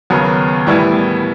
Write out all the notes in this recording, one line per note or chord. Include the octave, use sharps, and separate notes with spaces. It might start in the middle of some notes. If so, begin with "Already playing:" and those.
D#2 C#3 F#3 B3
A2 E3 G3 B3 E4